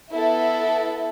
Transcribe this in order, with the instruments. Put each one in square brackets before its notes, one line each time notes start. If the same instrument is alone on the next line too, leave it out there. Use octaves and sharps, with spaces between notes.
[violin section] B3 E4 A4 E5